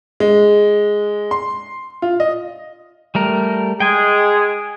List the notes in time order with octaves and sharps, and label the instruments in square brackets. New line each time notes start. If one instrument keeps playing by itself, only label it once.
[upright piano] G#3
C6
F4
D#5
[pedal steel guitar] G3 A3 A#4
[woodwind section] G#3 G#4 [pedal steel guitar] G5 G#5